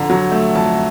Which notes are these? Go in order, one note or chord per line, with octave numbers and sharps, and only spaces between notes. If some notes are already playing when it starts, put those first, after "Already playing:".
Already playing: F2 D3 A#5
F#3
A3
F2 A5